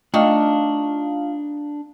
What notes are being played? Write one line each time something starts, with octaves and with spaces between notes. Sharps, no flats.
A3 D4 D#4 F4 F5 C#6